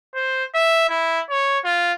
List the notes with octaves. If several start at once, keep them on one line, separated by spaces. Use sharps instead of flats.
C5
E5
E4
C#5
F4